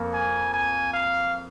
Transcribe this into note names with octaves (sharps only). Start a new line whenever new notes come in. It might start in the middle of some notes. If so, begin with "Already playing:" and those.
Already playing: F2 A#3
G#5
G#5
F5